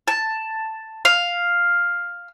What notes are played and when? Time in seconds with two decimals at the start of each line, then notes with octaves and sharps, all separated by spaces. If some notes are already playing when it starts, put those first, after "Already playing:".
0.08 A5
1.05 F5